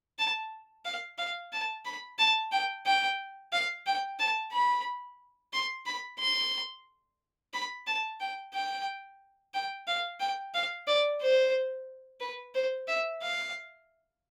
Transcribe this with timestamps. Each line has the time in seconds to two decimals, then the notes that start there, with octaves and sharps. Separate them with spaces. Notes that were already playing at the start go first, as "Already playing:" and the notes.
0.19 A5
0.85 F5
1.18 F5
1.53 A5
1.85 B5
2.19 A5
2.52 G5
2.86 G5
3.53 F5
3.87 G5
4.19 A5
4.53 B5
5.53 C6
5.86 B5
6.19 C6
7.54 B5
7.87 A5
8.21 G5
8.54 G5
9.54 G5
9.88 F5
10.20 G5
10.54 F5
10.87 D5
11.21 C5
12.21 B4
12.55 C5
12.88 E5
13.22 F5